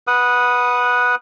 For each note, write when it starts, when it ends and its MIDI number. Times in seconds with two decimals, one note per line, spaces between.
0.07 1.15 71
0.07 1.15 78
0.07 1.15 87